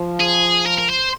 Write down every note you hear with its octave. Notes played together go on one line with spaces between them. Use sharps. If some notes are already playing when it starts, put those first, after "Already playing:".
Already playing: F3
G#4
A#4
A#4
C5